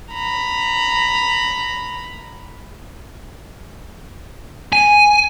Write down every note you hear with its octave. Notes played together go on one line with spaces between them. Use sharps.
A#5 B5
G#5